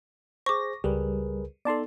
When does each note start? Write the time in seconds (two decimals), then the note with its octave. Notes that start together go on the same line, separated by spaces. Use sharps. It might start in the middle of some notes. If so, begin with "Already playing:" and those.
0.46 G#4 C5 C#6 D6 A#6
0.84 C#2 G3 G#4 A#4 B4
1.65 B3 D#4 A4 D5 A5 C6